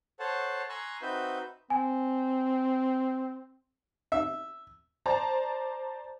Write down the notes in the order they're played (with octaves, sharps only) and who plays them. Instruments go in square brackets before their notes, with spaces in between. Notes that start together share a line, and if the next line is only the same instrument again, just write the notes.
[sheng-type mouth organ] A4 C5 C#5 F#5 A5
G#5 A#5 C6 C#6 E6 F#6
C4 D#4 F#4 B4 E5 G6
[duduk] C4 [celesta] G#5
[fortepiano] E5
[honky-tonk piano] C5 D5 A5 A#5